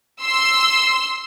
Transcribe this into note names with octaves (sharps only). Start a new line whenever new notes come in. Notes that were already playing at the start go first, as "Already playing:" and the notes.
C6 E6